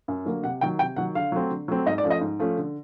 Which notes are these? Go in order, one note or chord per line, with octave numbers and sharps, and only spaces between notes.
F#2
D3 F#3 A#3
C3 F#5
D#3 F#3 G5
C3 G5
D#3 F#3 F#5
D3 F5
F#3 A3 C4
D3
F#3 A3 C4
G#2 D#5
D5
F3 A3 C#4
D#5
G#2
F3 A3 C#4
D3